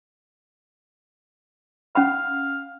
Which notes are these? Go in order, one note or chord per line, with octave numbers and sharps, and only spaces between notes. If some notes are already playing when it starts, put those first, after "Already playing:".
C#4 F5 F#5 B5